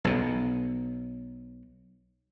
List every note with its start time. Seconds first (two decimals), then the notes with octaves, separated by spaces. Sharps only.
0.04 B1 B2